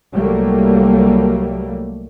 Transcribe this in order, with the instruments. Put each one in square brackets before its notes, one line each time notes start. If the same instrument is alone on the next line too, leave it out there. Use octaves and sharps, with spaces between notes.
[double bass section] C2 F#3 G3 A3 A#3